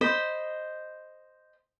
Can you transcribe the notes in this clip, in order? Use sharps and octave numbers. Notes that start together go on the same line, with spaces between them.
C5 D#5 B5